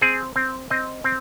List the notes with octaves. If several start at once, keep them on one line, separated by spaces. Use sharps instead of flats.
C4 G#4
C4
C4 D#5
C4